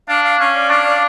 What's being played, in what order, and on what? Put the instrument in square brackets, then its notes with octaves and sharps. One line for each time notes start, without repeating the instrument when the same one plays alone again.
[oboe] D4 [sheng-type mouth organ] F5
[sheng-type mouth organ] F5
[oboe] C#4 [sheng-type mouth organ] F5
[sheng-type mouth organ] D5
[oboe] D4 [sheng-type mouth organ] F5
[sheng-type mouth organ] D5